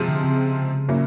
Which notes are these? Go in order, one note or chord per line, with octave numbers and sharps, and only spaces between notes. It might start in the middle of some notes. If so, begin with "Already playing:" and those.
Already playing: C3 F3 G#3 C4
D3
C#3
A#2 F#3 A#3 C#4 E4